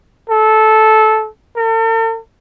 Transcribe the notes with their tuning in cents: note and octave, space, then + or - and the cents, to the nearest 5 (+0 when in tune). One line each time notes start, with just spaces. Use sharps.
A4 -15
A4 +45